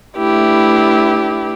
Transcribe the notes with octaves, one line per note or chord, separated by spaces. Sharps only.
A3 D4 E4 G4 B4